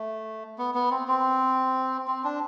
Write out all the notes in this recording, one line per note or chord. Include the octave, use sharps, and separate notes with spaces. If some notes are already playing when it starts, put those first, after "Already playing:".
Already playing: A3
B3
B3
C4
C4
C4
D4